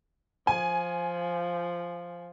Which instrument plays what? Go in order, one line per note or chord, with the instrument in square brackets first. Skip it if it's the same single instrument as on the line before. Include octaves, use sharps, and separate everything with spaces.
[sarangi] F3 [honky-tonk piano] G#5